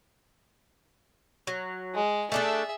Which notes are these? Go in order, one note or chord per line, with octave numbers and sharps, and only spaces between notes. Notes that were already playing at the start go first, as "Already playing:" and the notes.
F#3
G#3
A3 D4 G#4 A4 E5